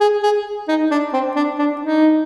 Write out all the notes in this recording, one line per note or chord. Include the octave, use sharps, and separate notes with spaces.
G#4
G#4
D#4
D4
C4
D4
D4
D#4